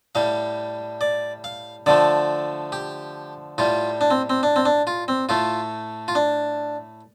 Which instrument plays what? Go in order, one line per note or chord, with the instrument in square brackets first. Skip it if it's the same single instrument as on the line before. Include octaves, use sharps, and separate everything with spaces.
[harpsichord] A2 G3 F5
D5
F5
D3 F3 A3 D5
G4
A2 G3 F4
D4
C4
C4
D4
C4
D4
F4
C4
A2 A3 F4
F4
D4